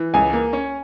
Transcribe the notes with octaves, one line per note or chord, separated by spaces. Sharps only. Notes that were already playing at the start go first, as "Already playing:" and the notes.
Already playing: E3
C#2 G#5
A#3
C#4